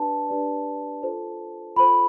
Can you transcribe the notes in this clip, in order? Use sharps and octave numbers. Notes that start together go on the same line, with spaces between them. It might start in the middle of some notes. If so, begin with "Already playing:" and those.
Already playing: D4 G4 B4 D5 A5
D4 G4 B4 D5
F4 A4 C5
F4 A4 C5 B5